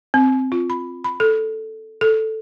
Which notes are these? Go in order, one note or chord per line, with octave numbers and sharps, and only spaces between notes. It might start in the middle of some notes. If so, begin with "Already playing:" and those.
C4
F4
B5
B5
A4
A4